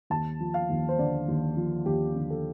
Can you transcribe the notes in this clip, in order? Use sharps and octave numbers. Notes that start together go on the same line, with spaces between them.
D#2 A5
F3
F5
D#2
C5
D3 D5
D#2
F3
D#2 G4
D3
A4